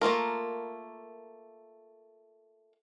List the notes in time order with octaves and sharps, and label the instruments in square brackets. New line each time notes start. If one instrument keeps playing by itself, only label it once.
[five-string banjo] A3 A#3 F4 A#4